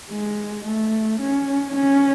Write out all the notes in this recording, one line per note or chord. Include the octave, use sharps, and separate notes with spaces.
G#3
A3
C#4
C#4